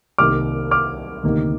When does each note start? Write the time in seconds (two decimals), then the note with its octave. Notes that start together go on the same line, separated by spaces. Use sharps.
0.18 C2 C3 D#3 A#3 D6 F6
0.71 D6 F6
1.24 D2 C3 D#3 A#3